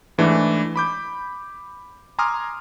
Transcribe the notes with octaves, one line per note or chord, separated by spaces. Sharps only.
G#2 E3 A3 D4
B5 D6 G6
G#5 A#5 C6 D6 D#6 F6